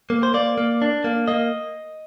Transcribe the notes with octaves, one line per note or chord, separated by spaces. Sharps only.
A#3
C5
A#3 D5
A#3
D4
A#3
A#3 D#5